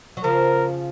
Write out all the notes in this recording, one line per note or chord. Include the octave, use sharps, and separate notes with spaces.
F#3
C#3 F3 A#4